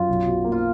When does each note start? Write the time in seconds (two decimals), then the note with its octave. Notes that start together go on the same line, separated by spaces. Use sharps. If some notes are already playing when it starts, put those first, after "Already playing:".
Already playing: F#2 F4
0.09 B1
0.27 B2
0.44 A#3
0.52 F4